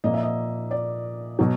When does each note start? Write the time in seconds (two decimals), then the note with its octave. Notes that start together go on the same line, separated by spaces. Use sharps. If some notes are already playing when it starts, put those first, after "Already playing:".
0.04 A#2 F3 A#3 D#5
0.14 E5
0.23 D#5
0.71 D5
1.39 B2 F#3